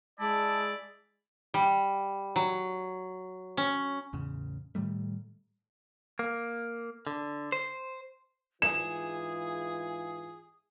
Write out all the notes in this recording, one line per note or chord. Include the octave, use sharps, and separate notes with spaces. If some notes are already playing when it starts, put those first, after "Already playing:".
G#3 E4 D5 A5
G3
F#3
C#4
A1 E2 C#3
A2 D#3 G3 A3
A#3
D3
C5
G#2 E3 F4 G#4 E7